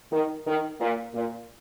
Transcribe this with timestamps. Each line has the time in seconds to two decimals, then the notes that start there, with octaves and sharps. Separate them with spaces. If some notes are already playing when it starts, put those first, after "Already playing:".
0.12 D#3
0.47 D#3
0.80 A#2
1.15 A#2